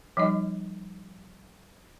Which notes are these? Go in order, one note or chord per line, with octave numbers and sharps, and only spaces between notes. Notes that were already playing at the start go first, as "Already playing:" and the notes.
F3 G3 D#4 D#5